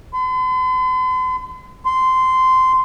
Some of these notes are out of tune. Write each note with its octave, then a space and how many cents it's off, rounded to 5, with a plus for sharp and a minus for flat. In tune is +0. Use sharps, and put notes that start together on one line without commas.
C6 -45
C6 -15